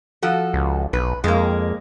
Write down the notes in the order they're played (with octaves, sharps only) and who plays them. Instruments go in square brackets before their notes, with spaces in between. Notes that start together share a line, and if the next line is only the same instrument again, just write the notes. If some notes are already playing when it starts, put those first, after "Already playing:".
[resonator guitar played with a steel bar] F3 F#4 A4
[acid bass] C#2
[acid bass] B1 [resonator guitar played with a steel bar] B4
[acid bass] F2 [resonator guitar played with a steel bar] G#3 A#3